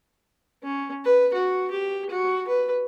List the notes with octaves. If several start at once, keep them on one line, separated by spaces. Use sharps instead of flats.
C#4
B4
F#4
G4
F#4
B4